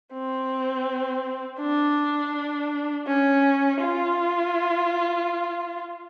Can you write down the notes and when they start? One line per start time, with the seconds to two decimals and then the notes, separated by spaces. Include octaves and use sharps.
0.13 C4
1.61 D4
3.07 C#4
3.81 F4